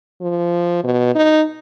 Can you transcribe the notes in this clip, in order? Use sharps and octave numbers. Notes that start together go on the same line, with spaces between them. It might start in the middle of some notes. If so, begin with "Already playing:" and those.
F3
B2
D#4